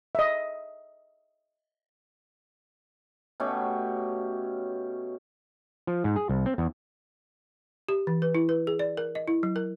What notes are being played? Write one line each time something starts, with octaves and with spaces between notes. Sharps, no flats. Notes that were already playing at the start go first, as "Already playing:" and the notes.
D#5 E5
B2 A3 C#4 G4
F3
G#2
G#4
C2
C4
E2
G4
E3
B4
E4
B4
G#4
D5
A#4
D#5
E4
F#3
A#4